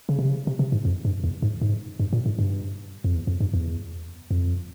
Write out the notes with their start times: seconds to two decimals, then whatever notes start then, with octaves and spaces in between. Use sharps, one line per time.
0.09 C#3
0.19 C3
0.29 C#3
0.47 C3
0.59 C3
0.72 G#2
0.85 F2
1.05 G2
1.24 E2
1.42 G#2
1.61 G#2
1.99 G2
2.13 A#2
2.26 G#2
2.39 G2
3.04 F2
3.15 E2
3.27 F2
3.40 G2
3.53 E2
4.31 F2